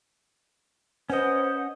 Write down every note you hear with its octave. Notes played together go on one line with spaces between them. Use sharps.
C#4 B4 C5 D#5 F#5